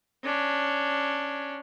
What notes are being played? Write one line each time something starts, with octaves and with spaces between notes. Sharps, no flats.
C#4 D4